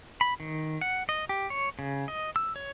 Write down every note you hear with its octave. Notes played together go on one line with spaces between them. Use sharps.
B5
D#3
F#5
D#5
G4
C#5
C#3
D#5
E6
C#5